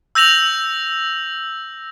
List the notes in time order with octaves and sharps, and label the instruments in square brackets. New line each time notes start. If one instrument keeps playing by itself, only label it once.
[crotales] E6 G6 A#6 F7 F#7